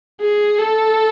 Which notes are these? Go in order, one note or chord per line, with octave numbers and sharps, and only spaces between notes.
G#4
A4